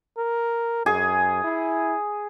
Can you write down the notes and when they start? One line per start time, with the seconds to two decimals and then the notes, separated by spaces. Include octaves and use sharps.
0.18 A#4
0.86 F#2 G#4
1.44 E4